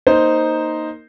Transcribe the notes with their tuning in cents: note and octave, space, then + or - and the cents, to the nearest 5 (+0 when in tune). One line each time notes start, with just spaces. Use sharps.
A#3 +0 D#4 +0 C5 +0